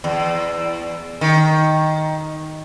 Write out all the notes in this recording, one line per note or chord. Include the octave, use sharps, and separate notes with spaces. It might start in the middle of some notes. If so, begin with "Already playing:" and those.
E2
D#3